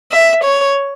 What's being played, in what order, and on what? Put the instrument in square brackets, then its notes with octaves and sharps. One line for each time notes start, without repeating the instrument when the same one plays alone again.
[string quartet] E5
C#5